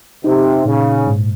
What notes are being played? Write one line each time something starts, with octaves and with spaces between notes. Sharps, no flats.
C3 D#4
A#2 C#3
G#2